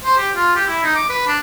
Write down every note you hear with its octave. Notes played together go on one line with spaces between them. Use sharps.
C5
G4
F4
G4
E4
D#4
D6
B4
D4